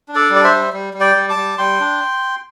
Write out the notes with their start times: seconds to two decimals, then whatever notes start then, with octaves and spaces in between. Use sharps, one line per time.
0.08 D4
0.15 A4 D5
0.30 G3
0.35 D5
0.44 C5 E5
0.51 G3
0.73 G3
0.94 G3
1.00 D5 G5
1.16 G3
1.29 A5 D6
1.36 G3
1.58 G3 G5 C6
1.80 D4